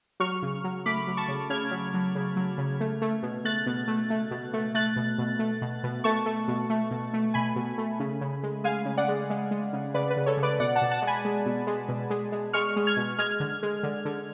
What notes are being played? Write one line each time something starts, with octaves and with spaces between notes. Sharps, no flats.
F#3 C#6 F6
C#3
F#3
A3 B5 D6
F#3
A5 C#6
C#3
C#3 F6 G#6
F#3
F#3
C#3
F#3
C#3
A3
A3
B2
A3 F#6 A6
B2
A3
A3
B2
A3
A3 F#6 A6
B2
B2
A3
B2
B2
A3 A5 C#6
A3
B2
A3
B2
A3
B2 G#5 B5
B2
A3
C#3
C#3
G#3
G#3 F5 G#5
C#3
D5 F#5
G#3
G#3
G#3
C#3
C#3 B4 D5
B4
C#3
A4 C#5
C#3
B4 D5
B2 D5 F#5
F#5 A5
B2
F#5 A5
G#3
G#5 B5
G#3
B2
G#3
B2
G#3
G#3
G#3 C#6 F6
G#3
F6 G#6
B2
G#3 F6 G#6
D3
G#3
D3
D3